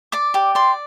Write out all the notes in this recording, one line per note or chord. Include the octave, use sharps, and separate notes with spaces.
D5 D6
G4 D6
D5 C6